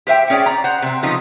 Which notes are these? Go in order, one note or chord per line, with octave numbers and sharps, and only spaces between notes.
G4 C5 E5 G5
C#4 G#4 C#5 D5 G5
D5 A#5
C5 F#5 A#5
C3 C4
C#3 F3 B3 D#4